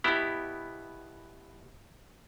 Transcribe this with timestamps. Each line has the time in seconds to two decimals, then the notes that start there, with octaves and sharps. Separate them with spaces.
0.04 B2 B3 E4 G4